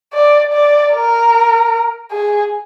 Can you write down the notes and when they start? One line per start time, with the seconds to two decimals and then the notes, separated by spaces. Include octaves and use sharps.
0.13 D5
0.53 D5
0.93 A#4
2.11 G#4